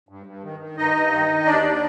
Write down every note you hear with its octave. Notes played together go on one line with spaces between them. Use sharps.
G2
G2
D#3
D#3
G2 D#4 D#5
G2
D#3
D#3
D#2 D4 D5
D#2